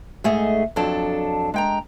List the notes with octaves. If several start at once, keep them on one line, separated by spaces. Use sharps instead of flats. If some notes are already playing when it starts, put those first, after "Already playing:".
G#2 A3 G#4 D#5
F2 F#3 D4 A4
G#3 G5 A#5